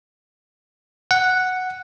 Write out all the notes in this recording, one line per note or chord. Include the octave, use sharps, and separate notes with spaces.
F#5